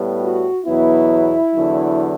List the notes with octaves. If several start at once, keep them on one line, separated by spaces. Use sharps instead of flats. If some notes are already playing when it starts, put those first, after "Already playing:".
Already playing: A2 G3 B3
F#4
E2 B2 F#3 B3 E4
E2 D3 F#3